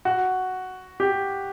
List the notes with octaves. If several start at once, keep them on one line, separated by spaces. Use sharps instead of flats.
F#4
G4